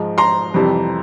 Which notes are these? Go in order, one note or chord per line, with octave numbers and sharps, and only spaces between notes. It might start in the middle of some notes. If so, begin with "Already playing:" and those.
Already playing: G#2 F3 G#3
A#5 C6
F2 C3 E3 G3